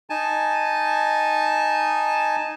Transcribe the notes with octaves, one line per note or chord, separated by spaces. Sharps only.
D#4 G#5 A5